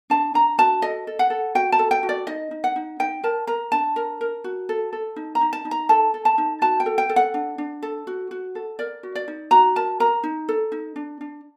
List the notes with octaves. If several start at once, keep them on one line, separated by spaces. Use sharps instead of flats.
D4 A5
D4 A#5
F#4 A5
A4 D#5
A4
F#5
A4
F#4 G5
A5
A4
G5
F#4
D5
D#4 D#5
D#4
F#5
D#4
D#4 G5
A#4 A5
A#4 A#5
D4 A5
A#4
A#4
F#4
A4
A4
D#4
A#5
D#4
A5
D#4
A#5
A4 A5
A4
A5
D#4
F#4 A5
G5
A4
G5
A4
F#5
D4
D4
A4
F#4
F#4
A4
A#4 D5
F#4
D5
D#4
F#4 A#5
A#4 A5
A#4 A#5
D#4
A4
D#4
D4
D4